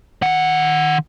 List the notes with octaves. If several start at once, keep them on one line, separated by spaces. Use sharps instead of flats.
D#3 F#5